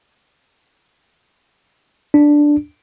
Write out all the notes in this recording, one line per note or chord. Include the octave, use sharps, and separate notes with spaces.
D4